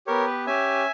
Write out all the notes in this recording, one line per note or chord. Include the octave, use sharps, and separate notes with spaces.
B3 G4 A#4 C#5
B4
C#4 G4 E5 G#5